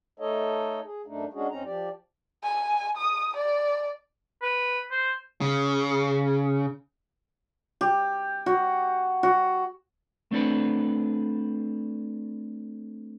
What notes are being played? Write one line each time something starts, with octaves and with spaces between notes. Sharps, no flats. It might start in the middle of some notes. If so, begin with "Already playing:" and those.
A3 D#4 A4 C#5 D#5
G#4
F#2 A3 D4 D#4
G#3 C#4 D4 F#4 G#4
F2 C4 C#4 D#4 A#5
F3 G4 D5
G#5
D#6
D5
B4
C5
C#3
G4
F#4
F#4
A3 C4 D4 A4 B4